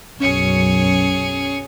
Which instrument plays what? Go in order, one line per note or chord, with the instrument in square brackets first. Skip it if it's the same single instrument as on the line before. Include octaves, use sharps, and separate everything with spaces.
[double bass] B1 F#2 [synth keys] C#4 C#7 [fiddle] G#4 C#5